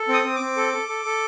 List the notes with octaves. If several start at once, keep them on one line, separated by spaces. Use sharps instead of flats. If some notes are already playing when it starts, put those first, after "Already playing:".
Already playing: A4
C4 D#6
C4
C4 D6
A4
A4
A4
A4